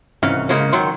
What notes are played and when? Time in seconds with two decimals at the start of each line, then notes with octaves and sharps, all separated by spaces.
0.23 C2 G#2 E3 C#4 F5
0.49 C#3 G#3 A#3 C#4
0.72 D#3 F#3 C6